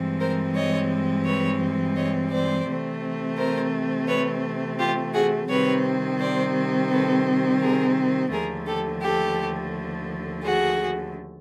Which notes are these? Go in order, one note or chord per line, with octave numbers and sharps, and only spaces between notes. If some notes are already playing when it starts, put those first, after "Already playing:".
Already playing: G2 E3 G#3 C4
A#4 C5
C#5 D#5
B4 C#5
C#5 D#5
C5 D5
C3 E3 A3 C4
A#4 C5
B4 C#5
F4 G4
F#4 G#4
C3 D#3 G3 C4 B4 C#5
C5 D5
A4 B4
G#4 A#4
D#2 D3 F3 A3 G#4 A#4
G4 A4
G4 A4
F#4 G#4